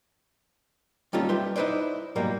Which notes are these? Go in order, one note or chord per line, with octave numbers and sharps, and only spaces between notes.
G3 A#3 C#4 D#4 F4 A4
G3 G4 B4 E5 C6
D#4 E4 B4 C5 D5
G#2 B2 F#3 G3 A#3